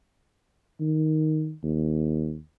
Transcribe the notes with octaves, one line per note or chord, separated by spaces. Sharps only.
D#3
D#2